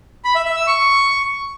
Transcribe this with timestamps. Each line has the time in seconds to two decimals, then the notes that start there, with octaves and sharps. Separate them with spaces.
0.24 B5
0.35 E5
0.46 E5
0.56 E6
0.67 C#6